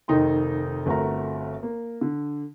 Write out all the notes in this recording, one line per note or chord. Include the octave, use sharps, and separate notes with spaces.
F1 D#3 D#4 G5 C6
G1 A3 C4 F#4 A#4 A#5
A#3
D3